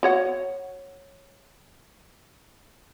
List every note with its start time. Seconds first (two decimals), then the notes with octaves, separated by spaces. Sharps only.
0.03 F#4 C#5 F#5